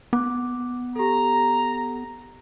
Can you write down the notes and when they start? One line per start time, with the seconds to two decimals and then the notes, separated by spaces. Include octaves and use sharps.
0.13 B3 D6 F#6
0.96 G4 A4 A#5